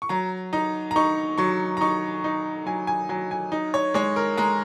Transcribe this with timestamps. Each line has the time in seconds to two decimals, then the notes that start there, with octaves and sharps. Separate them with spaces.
0.02 C#6
0.09 F#3 A#5
0.53 D#4 A#5
0.91 A#5
0.96 D#4 C#6
1.38 F#3 C#6
1.77 A#5
1.81 D#4 C#6
2.24 D#4
2.66 F#3 G#5
2.87 G#5
3.09 F#3 G#5
3.31 G#5
3.52 D#4
3.74 C#5
3.94 G#3 C#5
4.16 A#4
4.38 G#3 A#5